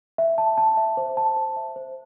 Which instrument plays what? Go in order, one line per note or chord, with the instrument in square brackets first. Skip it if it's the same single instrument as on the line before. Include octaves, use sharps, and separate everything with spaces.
[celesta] E5
A5
A5
E5
C5
A5
C5
E5
C5